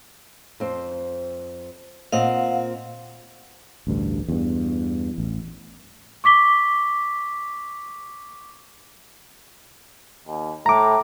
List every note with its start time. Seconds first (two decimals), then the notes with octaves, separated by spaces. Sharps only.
0.60 F2 C4 C5
2.12 A#2 C4 D#5 F5 F#5
3.87 A1 D2 G2
4.28 E2 G2
5.18 A1
6.24 C#6 D6 B6 G7
10.28 D#2
10.66 A2 A#5 D6